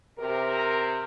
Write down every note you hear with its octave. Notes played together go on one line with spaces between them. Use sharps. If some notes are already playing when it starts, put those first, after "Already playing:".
C3 A#4